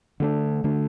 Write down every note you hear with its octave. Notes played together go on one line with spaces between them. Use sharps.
D3 A3 D4
D3 A3